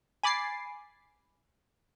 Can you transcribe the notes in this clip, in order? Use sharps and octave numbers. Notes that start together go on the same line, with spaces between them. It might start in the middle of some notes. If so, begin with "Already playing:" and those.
G#5 B5 D6 A6 C7